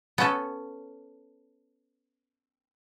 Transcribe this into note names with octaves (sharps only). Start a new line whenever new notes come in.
B3 C#4 A4